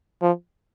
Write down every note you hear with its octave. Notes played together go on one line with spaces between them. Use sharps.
F3